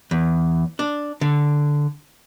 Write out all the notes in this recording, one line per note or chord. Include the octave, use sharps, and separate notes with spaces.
E2
D4
D3